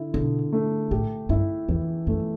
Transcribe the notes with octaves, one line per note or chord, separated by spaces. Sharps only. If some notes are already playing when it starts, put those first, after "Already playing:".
Already playing: D3 E4
B2 D3
A3
A2 G4
G2 E4
E2 E3
F#2 A3